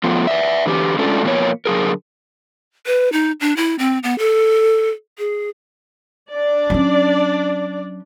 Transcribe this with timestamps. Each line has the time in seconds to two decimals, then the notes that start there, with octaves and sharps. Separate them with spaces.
0.04 F3 A3 B3 F4
0.27 B4 D5 E5
0.66 D3 E3 G4
0.98 G#3 A3 C#4 D4 F4 A4
1.24 B2 D#3 F3 A#3 B3 C#5
1.66 D3 F#3 G#4 A#4
2.86 B4
3.12 D#4
3.41 D4
3.57 E4
3.79 C4
4.03 B3
4.19 A4
5.18 G#4
6.32 D4 D5
6.70 F#3 C#4